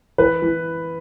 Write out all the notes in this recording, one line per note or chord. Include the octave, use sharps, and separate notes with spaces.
E3 B4
E3